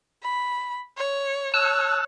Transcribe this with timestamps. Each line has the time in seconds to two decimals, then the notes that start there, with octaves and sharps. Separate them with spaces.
0.23 B5
0.98 C#5
1.54 C#5 A5 E6 F#6